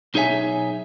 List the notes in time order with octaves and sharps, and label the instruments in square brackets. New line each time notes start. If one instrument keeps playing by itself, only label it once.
[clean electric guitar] B1 D#4 G#4 C#5 E5 G#5